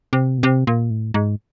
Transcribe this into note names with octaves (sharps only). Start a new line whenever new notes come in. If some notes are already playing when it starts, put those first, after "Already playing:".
C3
B2
C3
A#2
A2
G#2